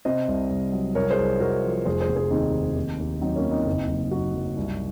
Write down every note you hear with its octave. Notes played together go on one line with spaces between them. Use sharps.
C3 C5 D#5
C2
C2
F#3
C2 A#4 C#5
G#4 C5
C2
C2 F#4 A#4
F3
F1 G#4 C5
G#4 C5
F1
G#4 C5
D#2 C4 D#4
D#3
D#2
D#2
F#3 C4 D#4
A#3 C#4
F#3
C4 D#4
F#1
F#1
F#2 D#4 F#4
F#2
C2